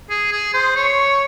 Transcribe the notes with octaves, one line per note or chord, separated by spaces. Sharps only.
G#4
G#4
C5
C#5